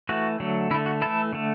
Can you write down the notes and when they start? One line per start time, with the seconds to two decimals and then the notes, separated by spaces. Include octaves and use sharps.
0.09 E3 A3 F#4
0.40 D3 F#3 A3
0.71 D3 E4
0.74 A3
0.86 F#4
1.01 E3 A3 E4 A4
1.33 D3 A3